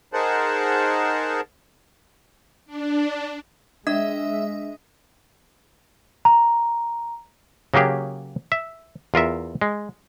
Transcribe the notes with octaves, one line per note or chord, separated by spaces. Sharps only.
D#4 G#4 A#4 C5 F#5 A5
D4
G#3 D4 D#5 E5
A#5
C#3 F#3 A#3 G4 G#4
E5
E2 F4 A#4 E5
G#3